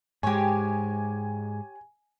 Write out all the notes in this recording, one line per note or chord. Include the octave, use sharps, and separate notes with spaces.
G#2 G#3 G4 C#5 G#5